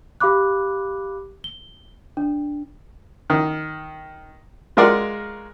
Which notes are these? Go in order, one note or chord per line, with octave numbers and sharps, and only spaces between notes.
G4 F5 B5 D6 F#6
G7
D4
D#3
G#3 F4 F#4 G#4 A#4 D5